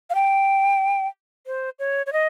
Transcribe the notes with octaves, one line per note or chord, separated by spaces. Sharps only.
F5
G5
C5
C#5
C#5
D#5